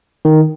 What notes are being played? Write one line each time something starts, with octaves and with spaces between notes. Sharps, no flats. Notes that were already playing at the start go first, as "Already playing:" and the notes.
D#3